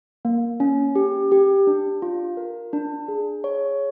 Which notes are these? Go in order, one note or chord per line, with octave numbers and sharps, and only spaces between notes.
A#3
C#4
G4
G4
D4
F4
A#4
D4
G#4
C#5